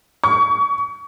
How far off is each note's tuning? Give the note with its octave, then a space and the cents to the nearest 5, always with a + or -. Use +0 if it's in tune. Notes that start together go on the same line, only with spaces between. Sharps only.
C#6 +30